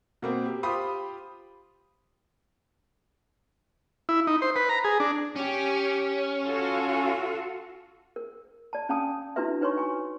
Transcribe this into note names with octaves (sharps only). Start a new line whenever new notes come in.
B2 A#3 C4
G4
F4 G4 C5 B5 C6 D#6
E4
D#4
C5
B4
A#5
G#4
D4
C#4 G4
F4 F#4 A4
A#4
D5 A5
C#4 F5 G#5 A5 D#6
D4 E4 F#4 A4 B4 E5
D#4 B4 C#5 G#5 C6 C#6
F#4 G#5 C#6